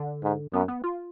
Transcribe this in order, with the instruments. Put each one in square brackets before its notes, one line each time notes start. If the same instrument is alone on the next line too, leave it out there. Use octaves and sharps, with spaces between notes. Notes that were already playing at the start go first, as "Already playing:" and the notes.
Already playing: [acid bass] D3
[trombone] G#2
[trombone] F#2 [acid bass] B3
[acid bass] B3
F4